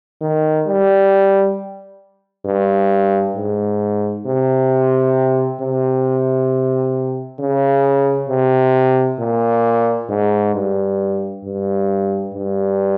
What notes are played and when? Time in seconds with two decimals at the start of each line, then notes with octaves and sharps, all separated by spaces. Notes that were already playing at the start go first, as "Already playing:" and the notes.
0.21 D#3
0.67 G3
2.45 G2
3.36 G#2
4.26 C3
5.61 C3
7.40 C#3
8.29 C3
9.19 A#2
10.09 G#2
10.54 G2
11.45 G2
12.33 G2